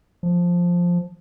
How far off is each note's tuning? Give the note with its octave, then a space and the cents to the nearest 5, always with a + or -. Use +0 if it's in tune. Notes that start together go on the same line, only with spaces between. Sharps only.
F3 +5